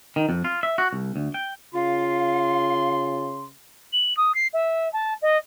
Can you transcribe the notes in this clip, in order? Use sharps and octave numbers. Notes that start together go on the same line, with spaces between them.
D#3
F2
F4
E5
F#4
C2
D2
G5
C#3 F4 F5 C6
F#7
D#6
C7
E5
A5
D#5